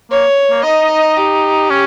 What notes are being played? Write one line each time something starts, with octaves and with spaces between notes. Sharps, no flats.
A#3 C#5
A#3
D#4 D#5
G4
C#4